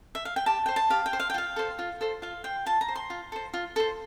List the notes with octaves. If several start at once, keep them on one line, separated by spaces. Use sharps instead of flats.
E5
F5
G5
G4 A5
C5 G5
A5
G4 F5
G5
C5
F5
G5
F4 F5
A4 C5
F4
A4 C5
F4 F5
C5 G5
F4 A5
A#5
C5
C6
F4
A4 C5
F4
A4 C5